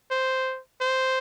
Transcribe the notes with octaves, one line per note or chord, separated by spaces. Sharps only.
C5
C5